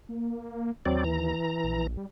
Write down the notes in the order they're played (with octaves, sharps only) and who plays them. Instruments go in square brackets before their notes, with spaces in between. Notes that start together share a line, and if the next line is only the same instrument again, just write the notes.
[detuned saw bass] A#3
[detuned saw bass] D#2 [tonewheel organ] F#3 C4 D5
[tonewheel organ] E3 A#5
[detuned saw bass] A#1
G3